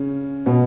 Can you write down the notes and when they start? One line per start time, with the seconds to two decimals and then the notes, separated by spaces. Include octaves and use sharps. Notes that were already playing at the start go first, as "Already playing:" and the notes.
Already playing: C#3 C#4
0.46 B2 B3